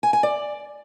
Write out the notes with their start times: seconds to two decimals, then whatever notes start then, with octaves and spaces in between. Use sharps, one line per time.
0.03 G#5
0.13 G#5
0.23 D5